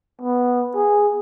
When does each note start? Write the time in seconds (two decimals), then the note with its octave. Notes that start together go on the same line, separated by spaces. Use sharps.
0.21 B3
0.75 G#4